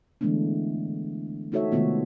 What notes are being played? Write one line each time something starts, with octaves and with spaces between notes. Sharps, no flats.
D3 E3 G#3 A3 B3 D4
A3 D#4 F#4 A4 C#5 E5
C3 D#3 G#3 A3 B3 F4